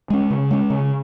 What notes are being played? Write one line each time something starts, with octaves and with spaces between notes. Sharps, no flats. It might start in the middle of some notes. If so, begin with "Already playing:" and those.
G#3 C#4
C#3
G#3 C#4
C#3